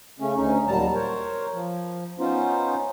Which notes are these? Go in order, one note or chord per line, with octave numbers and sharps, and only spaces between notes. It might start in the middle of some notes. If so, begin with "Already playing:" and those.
C#3 A3 C#4
D2 C#4 D#4
D#2 A#2 F#3 G3 A5 A#5
A#4 C5 C#5
F3
B3 C#4 D#4 F4 C5